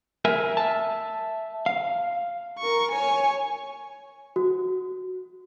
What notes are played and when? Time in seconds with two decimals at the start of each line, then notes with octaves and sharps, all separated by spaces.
0.25 A#4 E5 G#5
0.57 E5 A5
1.66 F5
2.59 A#4 C#6
2.92 C#5 G#5
4.36 F#4